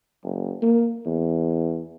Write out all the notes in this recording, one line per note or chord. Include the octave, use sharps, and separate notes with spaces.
F#1
A#3
E2